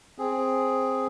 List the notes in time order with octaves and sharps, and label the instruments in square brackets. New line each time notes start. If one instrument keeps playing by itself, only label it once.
[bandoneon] C4 G#4